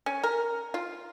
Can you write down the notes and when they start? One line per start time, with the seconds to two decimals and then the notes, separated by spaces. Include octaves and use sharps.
0.06 C#4
0.24 A#4
0.74 F4